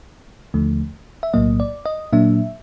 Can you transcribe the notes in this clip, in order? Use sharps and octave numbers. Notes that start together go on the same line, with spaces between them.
D#2 D3 F3 A3
E5
B1 A2 F#3 A#3 D#5
D5
D#5
A#2 F#3 A#3 D4 E5